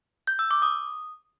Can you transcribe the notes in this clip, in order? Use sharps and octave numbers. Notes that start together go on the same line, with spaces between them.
G6
E6
D6
D#6